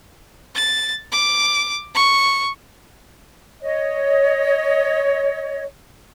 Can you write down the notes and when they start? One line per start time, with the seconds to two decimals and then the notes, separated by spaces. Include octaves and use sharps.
0.55 A6
1.12 D6
1.95 C#6
3.62 C#5 D#5